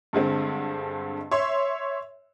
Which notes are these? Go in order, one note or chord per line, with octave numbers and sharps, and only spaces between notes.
G2 D3 G#3 C4
C#5 E5 C6